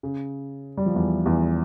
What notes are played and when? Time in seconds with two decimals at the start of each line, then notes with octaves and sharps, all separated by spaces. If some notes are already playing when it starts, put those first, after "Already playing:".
0.03 C#3
0.77 G3
0.86 F3
0.95 E2 E3
1.25 E2 E3